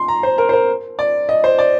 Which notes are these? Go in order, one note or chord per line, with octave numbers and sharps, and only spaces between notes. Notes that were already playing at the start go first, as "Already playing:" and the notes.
Already playing: C6
A#5
C5
A#4
C5
A#4
D5
D#5
C5
D5